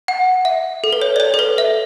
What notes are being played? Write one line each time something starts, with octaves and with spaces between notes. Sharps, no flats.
F#5
E5
A4
B4
C#5
D5
C#5
A4
B4
E5